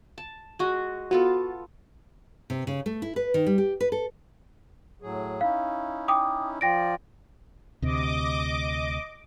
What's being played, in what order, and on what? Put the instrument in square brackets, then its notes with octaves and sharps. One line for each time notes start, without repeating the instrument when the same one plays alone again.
[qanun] A5
G#3 F#4
[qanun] B3 F4 A4 [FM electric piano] F#4
[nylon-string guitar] C3
C#3
A3
E4
B4
D#3
G3
G4
B4
A4
[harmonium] A2 F#3 G#4
[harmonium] C#4 D#4 E4 [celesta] F5
[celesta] G5 D6 D#6
[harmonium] F3 F4 D5 [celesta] G5 A#6 D7
[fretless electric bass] D2 C3 [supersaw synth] D#5 D6